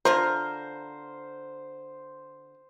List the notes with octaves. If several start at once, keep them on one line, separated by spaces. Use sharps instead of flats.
D3 F4 A#4 C5